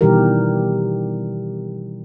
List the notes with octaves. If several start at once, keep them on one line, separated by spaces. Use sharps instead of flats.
B2 D#3 E3 G3 G4 A#4